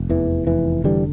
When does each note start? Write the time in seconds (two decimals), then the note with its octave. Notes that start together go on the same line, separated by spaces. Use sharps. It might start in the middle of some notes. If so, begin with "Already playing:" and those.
Already playing: F1
0.10 E2 E3
0.47 F1 E3
0.84 D3 E3 G3